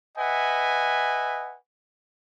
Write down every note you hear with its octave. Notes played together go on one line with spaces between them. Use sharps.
B4 D#5 E5 F#5 G#5